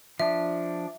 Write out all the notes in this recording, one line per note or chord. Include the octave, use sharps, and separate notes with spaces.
F3 D4 E5